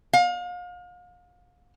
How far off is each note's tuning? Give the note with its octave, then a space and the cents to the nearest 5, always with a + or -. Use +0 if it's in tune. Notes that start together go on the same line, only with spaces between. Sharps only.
F5 +35